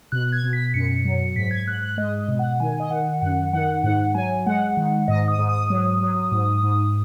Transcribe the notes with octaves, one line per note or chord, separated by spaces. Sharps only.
B2 F#6
G#6
B2
B6
F#2 C#7
F#3
G#2 B6
G#6
G#2 F#6
F#6
G#3 D#5
D#5
B2
F#5
D#3 G#5
D#5
D#3 F#5
F#2 F#5
D#3 F#5
G#2 F#5
F#3 G#5
G#3 F#5
D#3
G#2 D#5
D#6
G#2
D#6
F#3
F#3
G#2
G#2